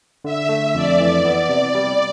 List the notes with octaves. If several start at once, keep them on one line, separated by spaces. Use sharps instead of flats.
D3 E5
A3
F2 D5
E3
B3
C3
G3